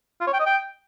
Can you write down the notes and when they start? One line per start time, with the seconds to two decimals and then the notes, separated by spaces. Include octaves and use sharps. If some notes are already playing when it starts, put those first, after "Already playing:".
0.21 F4
0.27 C#5
0.33 G5
0.40 D#5
0.46 G5